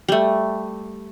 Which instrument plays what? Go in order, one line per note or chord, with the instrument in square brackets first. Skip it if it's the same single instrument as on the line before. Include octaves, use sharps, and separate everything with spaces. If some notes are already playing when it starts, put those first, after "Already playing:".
[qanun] G3 A3